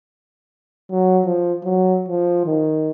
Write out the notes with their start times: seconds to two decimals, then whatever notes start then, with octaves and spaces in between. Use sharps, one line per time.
0.91 F#3
1.25 F3
1.64 F#3
2.09 F3
2.46 D#3